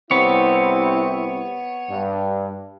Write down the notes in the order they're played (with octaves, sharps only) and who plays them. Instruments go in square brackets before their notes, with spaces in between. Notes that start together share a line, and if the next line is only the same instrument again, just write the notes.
[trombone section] C2 C4 E4 [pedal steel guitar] B3 C#5
[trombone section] G2